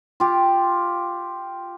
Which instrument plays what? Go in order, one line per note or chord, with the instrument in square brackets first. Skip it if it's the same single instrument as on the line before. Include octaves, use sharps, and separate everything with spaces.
[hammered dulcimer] F4 G4